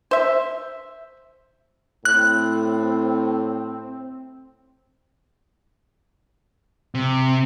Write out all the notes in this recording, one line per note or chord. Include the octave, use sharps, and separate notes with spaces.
C5 E5
A2 C4 F#6
C3